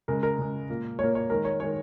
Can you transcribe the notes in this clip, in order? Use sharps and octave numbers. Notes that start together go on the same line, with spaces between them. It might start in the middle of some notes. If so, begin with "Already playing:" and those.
C#3 G#3 A#4
A#4
C#3 G#3
A#2 A#3
A#2 A#3 C#5
C#5
D#3 G#3 A#4
C#5
D#3 G#3 C#5